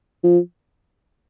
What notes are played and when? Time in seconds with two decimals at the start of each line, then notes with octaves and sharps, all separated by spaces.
0.24 F3